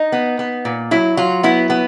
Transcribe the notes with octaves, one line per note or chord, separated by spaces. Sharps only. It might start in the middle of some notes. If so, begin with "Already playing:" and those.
Already playing: D#4
B3
B3
A#2
F#3 E4
F#3 F4
B3 E4
B3